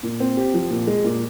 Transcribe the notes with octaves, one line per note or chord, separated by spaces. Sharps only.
A#2
C4
G4
F3
A#2
G#3
A#2